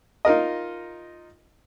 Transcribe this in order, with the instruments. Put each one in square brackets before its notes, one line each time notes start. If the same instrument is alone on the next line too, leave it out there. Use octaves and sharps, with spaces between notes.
[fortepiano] D#4 F4 A#4 D#5